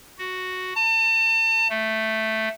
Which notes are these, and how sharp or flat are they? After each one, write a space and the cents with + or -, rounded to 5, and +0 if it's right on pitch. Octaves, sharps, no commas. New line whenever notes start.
F#4 +0
A5 +35
A3 +0